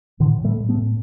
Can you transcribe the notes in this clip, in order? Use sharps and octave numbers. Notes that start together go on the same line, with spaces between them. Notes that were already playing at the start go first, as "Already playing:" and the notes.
A2 D3 E3
A2
G3 A3
A2
A3 B3
A2